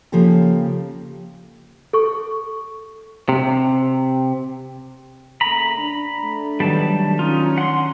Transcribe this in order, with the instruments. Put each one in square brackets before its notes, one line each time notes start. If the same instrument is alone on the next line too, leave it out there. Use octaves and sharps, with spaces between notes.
[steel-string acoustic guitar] C#3 F3 A#3 G4 A4
[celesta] A4 C#6
[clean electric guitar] C3
[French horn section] C#3 A3 A#3 [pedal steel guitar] A#5 B5
[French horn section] D4
[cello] A3
[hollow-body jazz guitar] D#3 F#3 B3 [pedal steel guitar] G3 A5
[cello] C#4 [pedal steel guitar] D#4 F4
[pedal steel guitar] F#5 C6